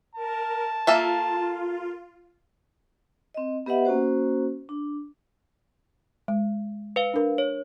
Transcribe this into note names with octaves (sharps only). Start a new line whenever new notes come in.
A#4 A5
A#3 F4 A4 E5
C4 D#5
B3 G4 B4 D#5 E5 F#5
A#3 C#4 F#4 C5
D4
G#3
B4 F5
D4 A#4
C#5